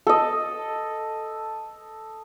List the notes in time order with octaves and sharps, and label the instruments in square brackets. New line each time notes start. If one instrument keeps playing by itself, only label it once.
[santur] A4 D#5